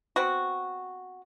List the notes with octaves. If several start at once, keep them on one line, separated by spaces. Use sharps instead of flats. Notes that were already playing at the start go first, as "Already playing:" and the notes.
B3 C4 F#4